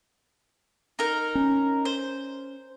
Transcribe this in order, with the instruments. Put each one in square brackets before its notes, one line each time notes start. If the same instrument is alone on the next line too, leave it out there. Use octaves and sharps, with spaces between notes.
[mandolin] D#4 A#4
[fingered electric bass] C#4
[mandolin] C5